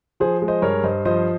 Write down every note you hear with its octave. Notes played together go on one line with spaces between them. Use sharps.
F3 G#4 C5
G#3
C5 D#5
G2 A#4 C#5
G2 C5 D#5
F3 C5 D#5